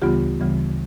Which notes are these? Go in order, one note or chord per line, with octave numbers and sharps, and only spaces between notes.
D2 C#3 E3 G3 B3 F4 G4
D2 C#3 E3 G3 B3